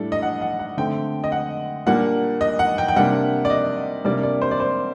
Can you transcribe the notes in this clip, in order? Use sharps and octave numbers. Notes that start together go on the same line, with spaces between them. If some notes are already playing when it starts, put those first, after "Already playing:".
Already playing: A2 G3 D4 A4
D#5
F#5
F#5
F#5
D3 A3 C4 G5
D#5
F#5
A#2 G3 A#3 D4 F#5
D#5
F#5
G5
G5
C3 G3 A#3 D4 F#5
D5
D#5
C3 G3 A#3 D4 D5
D5
C5
D5
C5